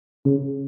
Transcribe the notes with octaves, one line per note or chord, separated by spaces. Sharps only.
C#3